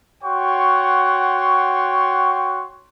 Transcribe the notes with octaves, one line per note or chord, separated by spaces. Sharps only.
F#4 C#5 F#5 G5 C6 C#6